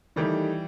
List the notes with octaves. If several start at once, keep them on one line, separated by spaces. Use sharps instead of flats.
D#3 E3 G3 A3 D#4 G4